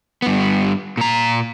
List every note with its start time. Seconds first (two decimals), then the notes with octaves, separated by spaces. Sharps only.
0.22 G2 B3
0.97 A#2 A#5